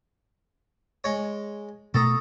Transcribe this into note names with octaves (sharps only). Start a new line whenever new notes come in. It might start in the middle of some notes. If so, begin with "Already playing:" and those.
G#3 C#5
B2 A3 A4 A#5 C#6 D#6